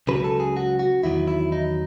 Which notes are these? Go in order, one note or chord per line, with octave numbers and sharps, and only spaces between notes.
C#2 C#3 F#3 B4
A4
G#4
F#4
F#4
E2 D#3 F#3 E4
E4
D#4